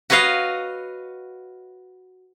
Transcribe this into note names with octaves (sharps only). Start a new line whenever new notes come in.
F#4 B4 C#5 D#5 F5